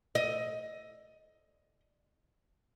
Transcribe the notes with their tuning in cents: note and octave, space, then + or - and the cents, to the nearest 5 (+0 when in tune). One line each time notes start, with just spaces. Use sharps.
D#5 +15